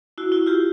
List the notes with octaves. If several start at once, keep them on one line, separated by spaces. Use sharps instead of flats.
E4 F#4
E4 F#4
F4 G4